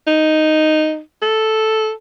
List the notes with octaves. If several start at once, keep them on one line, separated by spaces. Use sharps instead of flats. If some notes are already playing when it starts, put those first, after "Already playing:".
D#4
A4